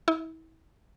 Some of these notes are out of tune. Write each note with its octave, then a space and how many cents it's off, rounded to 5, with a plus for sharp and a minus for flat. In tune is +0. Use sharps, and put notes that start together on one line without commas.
E4 -35